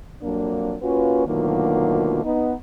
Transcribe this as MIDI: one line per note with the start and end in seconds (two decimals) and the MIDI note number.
0.22 0.75 41
0.22 0.75 54
0.22 0.75 58
0.22 0.75 62
0.82 1.24 58
0.82 1.24 61
0.82 1.24 65
0.82 1.24 66
0.82 1.24 71
1.26 2.19 38
1.26 2.19 47
1.26 2.19 51
1.26 2.19 54
1.26 2.19 58
1.26 2.19 65
2.24 2.54 59
2.24 2.54 63